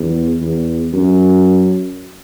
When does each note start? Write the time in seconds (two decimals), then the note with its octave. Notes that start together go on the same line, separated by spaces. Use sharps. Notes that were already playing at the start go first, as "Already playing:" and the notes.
Already playing: E2
0.41 E2
0.93 F#2